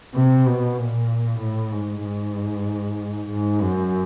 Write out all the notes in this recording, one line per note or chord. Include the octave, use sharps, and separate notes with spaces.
C3
B2
A#2
A2
G#2
G#2
G#2
F#2